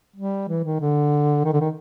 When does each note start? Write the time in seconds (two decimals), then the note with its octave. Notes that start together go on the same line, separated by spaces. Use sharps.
0.16 G3
0.49 E3
0.65 D#3
0.81 D3
1.45 D#3
1.53 D3
1.60 D#3